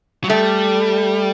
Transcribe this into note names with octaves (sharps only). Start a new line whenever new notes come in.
F#3
G3 A3